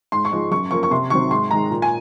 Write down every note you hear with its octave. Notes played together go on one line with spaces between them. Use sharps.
G#2 C6
C#6
F3 G#3 D#4
F#2 C#6
F3 A#3 C#4 C#6
C#6
C3 C6
D#3 F#3 C4 C#6
G#2 C6
D#3 G#3 A#5
A#2
G#5